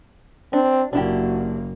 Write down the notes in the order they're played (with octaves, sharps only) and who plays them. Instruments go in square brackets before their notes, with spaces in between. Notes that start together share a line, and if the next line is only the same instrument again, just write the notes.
[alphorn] C4 [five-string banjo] D4
[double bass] F#1 A#3 [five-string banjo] D4 E4 G4 [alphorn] F#4